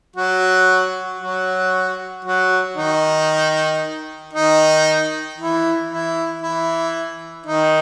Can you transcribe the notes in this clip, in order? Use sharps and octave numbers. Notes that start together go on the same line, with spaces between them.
F#3 F#4
F#3 F#4
F#3 F#4
D#3 D#4
D#3 D#4
E3 E4
E3 E4
E3 E4
D#3 D#4